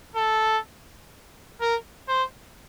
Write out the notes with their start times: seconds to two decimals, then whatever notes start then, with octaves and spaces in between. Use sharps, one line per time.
0.15 A4
1.61 A#4
2.09 C5